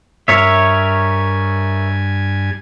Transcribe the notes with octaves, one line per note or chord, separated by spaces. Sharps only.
G2 A#4 C#5 E5 G#5